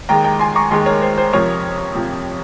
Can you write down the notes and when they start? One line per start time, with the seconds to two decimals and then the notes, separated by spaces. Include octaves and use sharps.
0.09 D#2 D#3 G#3 G5 A#5
0.24 G5 A#5
0.40 G#5 C6
0.55 A#5 C#6
0.71 D#2 D#3 G#3 G#5 C6
0.86 A#4 C#5
1.02 C5
1.18 C5
1.33 F2 C3 F3 A#4 C#5
1.95 F2 C3 F3